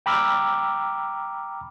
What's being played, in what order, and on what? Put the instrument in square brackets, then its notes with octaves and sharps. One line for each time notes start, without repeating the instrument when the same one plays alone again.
[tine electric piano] G5 A#5 B5 D6 E6 F6